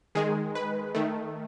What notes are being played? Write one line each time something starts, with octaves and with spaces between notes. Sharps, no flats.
D#3 G#3 G#4
B4
D#3 A3